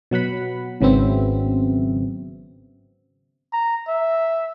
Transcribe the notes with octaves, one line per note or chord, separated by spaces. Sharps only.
B2 F#3 F#5 B5
G#1 C#3 F#3 B3 C4 E5
A#5
E5